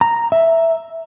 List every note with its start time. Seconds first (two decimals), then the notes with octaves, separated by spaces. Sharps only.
0.01 A#5
0.32 E5